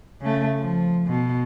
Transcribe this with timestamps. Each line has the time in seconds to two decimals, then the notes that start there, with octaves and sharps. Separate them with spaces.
0.21 C#3 A3
0.59 F3
1.07 B2